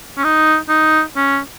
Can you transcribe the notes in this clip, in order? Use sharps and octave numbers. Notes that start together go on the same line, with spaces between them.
C#4
D#4
D#4
C#4